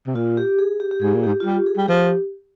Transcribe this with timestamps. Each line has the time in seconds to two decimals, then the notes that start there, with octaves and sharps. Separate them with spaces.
0.07 C3
0.15 A#2 F4
0.37 G4
0.59 G#4
0.80 G4
0.91 G4
1.02 G#2 G#4
1.14 A#2
1.23 G#2 G4
1.40 F4
1.44 G3 G4
1.66 G#4
1.77 G3
1.88 F3 G4